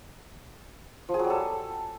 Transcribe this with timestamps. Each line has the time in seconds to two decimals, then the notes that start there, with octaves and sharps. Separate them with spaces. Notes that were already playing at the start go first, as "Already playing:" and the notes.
1.09 F3
1.14 G#4
1.19 F#3
1.25 G3
1.30 A4